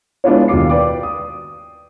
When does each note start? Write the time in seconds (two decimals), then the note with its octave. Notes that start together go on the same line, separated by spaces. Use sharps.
0.24 G#3 B3 D4 E4 F4 C#5
0.48 D#2 B2 F4 D6 C7
0.70 B4 D5 G5 D6
1.03 D#6